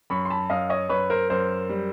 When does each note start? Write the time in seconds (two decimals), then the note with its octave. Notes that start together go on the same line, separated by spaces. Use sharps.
0.10 F#2 B5 C#6
0.25 C6
0.30 A5 B5
0.50 F#2 D#5 F5
0.70 C#5 D#5
0.89 F#2 B4 C#5
1.10 A#4 C5
1.30 F#2 A#4 C5
1.69 G3